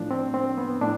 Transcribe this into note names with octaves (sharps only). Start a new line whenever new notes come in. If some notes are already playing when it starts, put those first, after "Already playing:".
Already playing: A2 F3 D4
C4
C4
B3
A2 D4